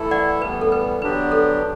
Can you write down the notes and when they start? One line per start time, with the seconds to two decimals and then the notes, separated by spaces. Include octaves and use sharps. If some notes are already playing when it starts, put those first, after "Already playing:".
Already playing: E3 A3 E4 A4
0.11 D5 F#5
0.41 A2 E3 G3 B3 B4
0.61 A4
0.72 B4
1.02 D3 F#3 B3 D4 G4 B4
1.32 A4